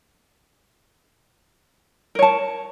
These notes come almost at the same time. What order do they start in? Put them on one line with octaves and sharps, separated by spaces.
A#4 C#5 A5